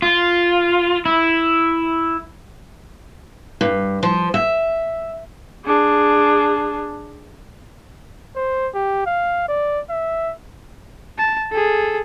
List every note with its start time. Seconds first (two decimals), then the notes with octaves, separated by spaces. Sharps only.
0.02 F4
1.05 E4
3.61 G2
4.03 F3
4.34 E5
5.65 D4 G#4
8.36 C5
8.75 G4
9.07 F5
9.48 D5
9.90 E5
11.18 A5
11.52 G#4 A4